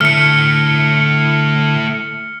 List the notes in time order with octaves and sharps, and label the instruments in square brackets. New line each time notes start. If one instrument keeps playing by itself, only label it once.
[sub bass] D3 [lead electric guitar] A3 E4 [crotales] F6 C#7